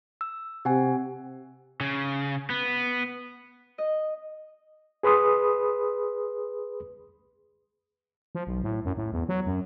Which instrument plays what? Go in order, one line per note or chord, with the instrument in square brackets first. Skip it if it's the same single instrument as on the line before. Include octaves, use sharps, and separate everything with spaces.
[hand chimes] E6
[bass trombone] C3 [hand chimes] G4 F#5 G#5
[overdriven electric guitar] C#3
B3
[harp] D#5
[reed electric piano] G#4 B4 B5 C6 D#6
[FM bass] F3
B1
A2
F#2
A2
E2
F#3
F#2